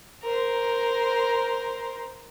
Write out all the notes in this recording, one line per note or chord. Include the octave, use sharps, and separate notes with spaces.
A#4 C5